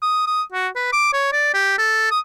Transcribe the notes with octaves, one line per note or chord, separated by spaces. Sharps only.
D#6
D#6
F#4
B4
D6
C#5
D5
G4
A4
D#6